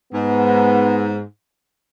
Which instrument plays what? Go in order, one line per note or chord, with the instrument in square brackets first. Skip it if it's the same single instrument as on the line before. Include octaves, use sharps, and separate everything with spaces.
[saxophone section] G#2 [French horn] B3